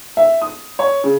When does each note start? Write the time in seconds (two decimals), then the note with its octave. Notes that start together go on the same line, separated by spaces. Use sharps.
0.17 E5
0.42 D#6
0.79 C#5
1.04 C#3